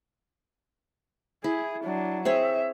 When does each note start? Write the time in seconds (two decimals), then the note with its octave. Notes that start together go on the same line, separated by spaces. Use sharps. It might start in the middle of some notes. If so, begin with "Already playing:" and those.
1.44 E4 G#4
1.84 F#3 D4
2.25 C4 G#4 C#5 E5